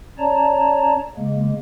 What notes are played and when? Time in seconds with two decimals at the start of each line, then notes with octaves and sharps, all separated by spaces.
0.18 C#4 C#5 D5 A5 A#5
1.16 C#3 G#3 A#3